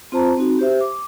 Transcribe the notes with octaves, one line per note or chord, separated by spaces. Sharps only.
C4 F4 C5 A5 A#5
C4 D#4 F#4
G4 C5 E5
D6